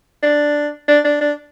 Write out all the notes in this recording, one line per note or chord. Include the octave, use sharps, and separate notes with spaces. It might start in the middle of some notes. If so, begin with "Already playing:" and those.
D4
D4
D4
D4